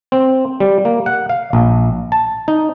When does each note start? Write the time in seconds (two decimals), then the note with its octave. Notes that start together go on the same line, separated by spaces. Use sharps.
0.12 C4
0.60 G3
0.85 A#3
1.06 F#5
1.29 F5
1.53 A#1
2.12 A5
2.48 D#4